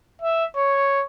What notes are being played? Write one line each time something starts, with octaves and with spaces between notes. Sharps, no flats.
E5
C#5